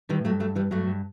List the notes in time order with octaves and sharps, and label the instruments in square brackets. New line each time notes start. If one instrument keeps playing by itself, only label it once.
[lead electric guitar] D#3 [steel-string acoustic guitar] E3 G3
[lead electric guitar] A2
[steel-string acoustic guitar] F#3 A3
[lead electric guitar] G2
[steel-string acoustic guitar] F#3 A3
E3 G3
[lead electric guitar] G2 [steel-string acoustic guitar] F#3 A3
[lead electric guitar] G2